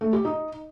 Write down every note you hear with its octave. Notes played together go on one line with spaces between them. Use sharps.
A3
G4
D#4